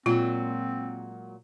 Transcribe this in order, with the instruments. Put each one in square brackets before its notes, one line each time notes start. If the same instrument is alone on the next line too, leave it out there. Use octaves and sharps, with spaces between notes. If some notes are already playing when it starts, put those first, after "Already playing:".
[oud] A#2 F#3 G#3 [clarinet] C4 [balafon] F4